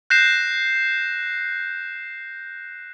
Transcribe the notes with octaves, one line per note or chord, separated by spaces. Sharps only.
F#6 G6 A#6 C7 E7